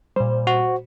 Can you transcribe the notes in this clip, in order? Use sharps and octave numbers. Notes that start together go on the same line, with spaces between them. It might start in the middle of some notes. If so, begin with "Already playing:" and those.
A#2 G3 C5
F#4